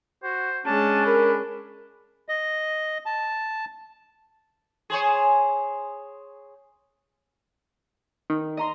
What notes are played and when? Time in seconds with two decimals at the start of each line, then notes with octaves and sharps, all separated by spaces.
0.24 F#4 C5
0.66 G#3 C#4 D4 A5
1.06 A#4 B5
2.29 D#5
3.06 A5
4.90 G#4 C5 C#5
8.30 D#3
8.57 D#5 A#5 C6